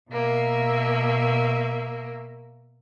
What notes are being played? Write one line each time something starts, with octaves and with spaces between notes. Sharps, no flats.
B2 A#3 E5